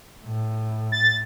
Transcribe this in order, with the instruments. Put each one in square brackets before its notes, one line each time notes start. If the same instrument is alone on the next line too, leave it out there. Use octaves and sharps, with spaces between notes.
[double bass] A2
[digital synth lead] A6